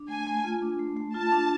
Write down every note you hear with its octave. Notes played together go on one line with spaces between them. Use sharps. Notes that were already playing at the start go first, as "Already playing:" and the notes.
Already playing: D4
A3 G#5
A3
F4
D4
A3
A3
F4 A5
D4